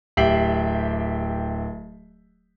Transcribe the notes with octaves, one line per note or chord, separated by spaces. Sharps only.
D1 G4 E5 G5 C7 F#7